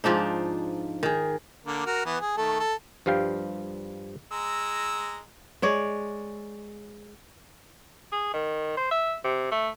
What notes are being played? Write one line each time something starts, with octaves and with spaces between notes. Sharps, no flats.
G#2 F3 D4 D#4
D#3 G#4
D3 A#3
F#4 A#4
E3 B3
G#4
D#3 A3 A4
A4
G2 F3 G3 F5 G5
G#3 A#5 E6
G#3 C#5 D5
G#4
D#3
C5
E5
C3
A3